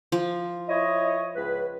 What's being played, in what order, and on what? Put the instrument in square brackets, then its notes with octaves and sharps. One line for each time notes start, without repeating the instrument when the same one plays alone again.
[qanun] F3
[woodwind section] E4 C#5 D#5
C#2 B4